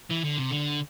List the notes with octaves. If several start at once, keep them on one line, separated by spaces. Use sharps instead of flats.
E3
D3
C3
D3